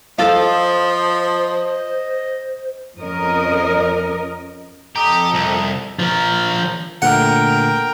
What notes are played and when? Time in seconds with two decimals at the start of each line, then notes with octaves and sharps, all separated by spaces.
0.18 F3 A4 C5 D#5 F5
2.99 F2 C#4 A#4 D#5
4.96 F2 G4 A4 D#5 A#5 D#6
5.34 C2
5.99 F3 A#4
7.02 A#2 D3 A3 A#4 F#5 G5